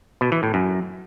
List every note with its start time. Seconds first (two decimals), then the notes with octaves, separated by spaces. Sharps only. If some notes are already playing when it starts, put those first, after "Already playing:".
0.21 B2
0.32 E3
0.43 A2
0.54 F#2